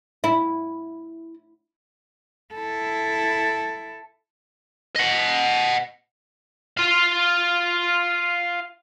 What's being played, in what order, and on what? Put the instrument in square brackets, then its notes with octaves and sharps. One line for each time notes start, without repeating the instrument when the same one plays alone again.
[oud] E4
[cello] E4 A4
[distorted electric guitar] D#5 F#5
F4 F5